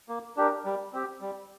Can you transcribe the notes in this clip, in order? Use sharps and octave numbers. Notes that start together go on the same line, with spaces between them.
A#3
D4 G4 A#4
G3
C4 G4
G3